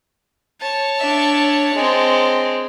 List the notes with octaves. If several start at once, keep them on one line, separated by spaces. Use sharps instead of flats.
C#5 A5
D4 E5
G#3 C4